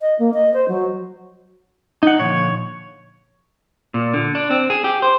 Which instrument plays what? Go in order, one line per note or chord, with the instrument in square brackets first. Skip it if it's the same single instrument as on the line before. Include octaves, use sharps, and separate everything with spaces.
[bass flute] D#5
A#3
D#5
C5
F#3
[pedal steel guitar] D#4 F#5
[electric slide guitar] A#2 D3 F3 [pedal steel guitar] C#5
[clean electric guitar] A#2
D3
D4
C4
G#4
G4
C5